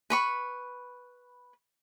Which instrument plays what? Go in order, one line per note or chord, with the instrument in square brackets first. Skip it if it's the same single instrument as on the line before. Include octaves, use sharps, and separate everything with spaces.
[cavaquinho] B4 B5 C#6